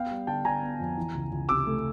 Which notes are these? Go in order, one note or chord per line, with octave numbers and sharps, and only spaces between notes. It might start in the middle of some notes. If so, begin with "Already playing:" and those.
Already playing: B3 F5 G5
G3
D3 G5 A5
D3 G#5 A#5
B3
F2
E3
C#2
C#2
C3 D6 E6
A3